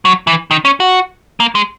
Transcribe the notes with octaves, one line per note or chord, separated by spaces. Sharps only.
F#3
E3
D#3
C#4
F#4
A#3
G#3